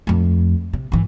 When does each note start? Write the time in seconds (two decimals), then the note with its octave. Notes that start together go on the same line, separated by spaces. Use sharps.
0.07 F2 A3
0.73 C3
0.92 G#1 E3